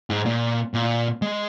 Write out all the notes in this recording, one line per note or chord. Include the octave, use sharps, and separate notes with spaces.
G#2
A#2
A#2
G#3